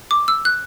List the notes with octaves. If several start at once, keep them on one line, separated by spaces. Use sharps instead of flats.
D6
E6
F#6